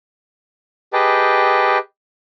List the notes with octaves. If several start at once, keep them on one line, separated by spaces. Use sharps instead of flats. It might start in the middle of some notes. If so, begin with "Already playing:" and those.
G4 G#4 B4 D#5 G5 A5